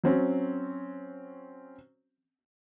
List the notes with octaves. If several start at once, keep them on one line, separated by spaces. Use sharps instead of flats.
F#3 C4 C#4